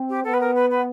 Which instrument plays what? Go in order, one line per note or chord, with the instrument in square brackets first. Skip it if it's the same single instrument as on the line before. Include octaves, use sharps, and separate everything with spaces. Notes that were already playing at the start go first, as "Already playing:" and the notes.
Already playing: [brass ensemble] C4
[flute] G4
[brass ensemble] B3 [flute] A4
[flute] B4
A#4
B4
B4